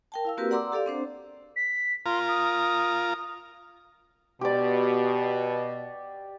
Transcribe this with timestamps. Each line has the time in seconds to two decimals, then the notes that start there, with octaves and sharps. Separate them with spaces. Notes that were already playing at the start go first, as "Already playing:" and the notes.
0.12 A#4 G5 A5
0.25 E4 F5 E6
0.37 A#3 C4 F#4 G4 A#4 B4
0.50 D5 F#5 A#5 C6 D6 E6
0.72 G4 A4 D5 F5
0.86 C4 D4 C5
1.56 B6
2.06 F4 A#4 C6
2.28 D#6
4.41 B2 G4 D5